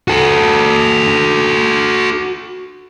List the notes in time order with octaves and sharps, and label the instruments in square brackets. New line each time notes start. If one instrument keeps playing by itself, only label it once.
[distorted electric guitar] F#4 A4